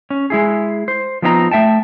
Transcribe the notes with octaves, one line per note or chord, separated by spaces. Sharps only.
C#4
G#3 E4 G#4
C5
F3 B3 C4 D#4 E5 A#5
A3 E5 G5 A5